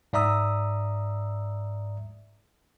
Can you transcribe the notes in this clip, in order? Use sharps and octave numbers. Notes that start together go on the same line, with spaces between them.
G#2 D5 E5 A#5 D#6 E6